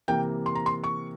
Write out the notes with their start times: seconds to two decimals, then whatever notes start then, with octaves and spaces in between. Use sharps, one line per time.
0.08 C3 E3 A#3 G5
0.46 C6
0.55 A#5
0.66 C6
0.84 C#6